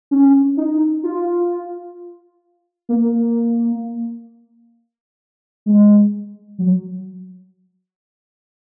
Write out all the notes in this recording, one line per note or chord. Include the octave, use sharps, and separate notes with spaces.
C#4
D#4
F4
A#3
G#3
F#3